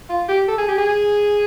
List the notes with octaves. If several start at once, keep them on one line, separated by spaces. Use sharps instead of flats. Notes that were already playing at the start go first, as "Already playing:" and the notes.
F4
G4
A4
G#4
G4
G#4